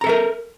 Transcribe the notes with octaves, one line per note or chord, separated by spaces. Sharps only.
A4 A#4 E5 A#5